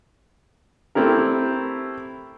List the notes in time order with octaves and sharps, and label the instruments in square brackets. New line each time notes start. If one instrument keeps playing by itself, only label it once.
[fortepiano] A3 C4 E4 G4 A#4